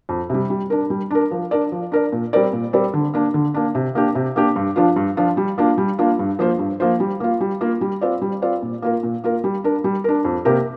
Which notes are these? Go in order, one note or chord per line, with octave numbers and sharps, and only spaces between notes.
F2
C3 G3
G3
D4 A#4
G3
D4 A#4
F3
D4 A#4 D5
F3
D4 A#4 D5
A#2
G3 C4 A#4 D5
A#2
G3 C4 A#4 D5
D3
A#3 D4
D3
A#3 D4
C3
A#3 D4 G4
C3
A#3 D4 G4
G2
F3 D4 F4
G2
F3 D4 F4
G3
A#3 D4 F4
G3
A#3 D4 F4
G2
F3 A#3 F4 C5
G2
F3 A#3 F4 C5
G3
A#3 F4
G3
A#3 F4
G3
C4 F4 D5
G3
C4 F4 D5
A#2
A#3 F4 A#4
A#2
A#3 F4 A#4
G3
D4 A#4
G3
D4 A#4
F2
C3 A#3 G4 A#4